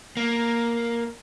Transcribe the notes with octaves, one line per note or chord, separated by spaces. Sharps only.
A#3